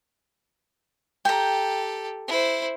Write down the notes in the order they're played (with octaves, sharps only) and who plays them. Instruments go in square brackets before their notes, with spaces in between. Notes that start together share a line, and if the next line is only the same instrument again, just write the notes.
[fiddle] G4 A4 [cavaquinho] G5 A#5
[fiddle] E4 C5